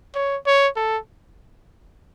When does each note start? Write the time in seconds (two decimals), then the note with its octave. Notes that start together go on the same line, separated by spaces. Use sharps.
0.15 C#5
0.46 C#5
0.76 A4